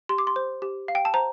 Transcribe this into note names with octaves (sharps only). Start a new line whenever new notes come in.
G4 C6
D6
C6
C5
G4
F5
G5
A5
C5 A#5